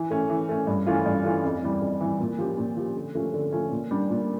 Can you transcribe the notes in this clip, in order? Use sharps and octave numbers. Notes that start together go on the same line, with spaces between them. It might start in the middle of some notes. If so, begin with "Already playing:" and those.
Already playing: E3
A3 C#4
E3
A3 C#4
G2
E3 A3 C#4 F4
G2
E3 A3 C#4 F4
F2
E3 G3
F2
E3 G3
A#2
F3 C#4 G4
A#2
F3 C#4 G4
D3
F3 A3 C#4
D3
F3 A3 C#4
A#2
G3 D4
A#2